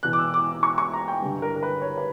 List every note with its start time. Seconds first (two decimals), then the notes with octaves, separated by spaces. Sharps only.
0.03 E2 B2 F#6
0.13 D6
0.18 E6
0.34 D6
0.63 C#6
0.78 C#6
0.93 A#5
1.08 G5
1.22 G2 D3
1.42 A#4
1.56 A#4
1.63 B4
1.82 C#5
1.98 B4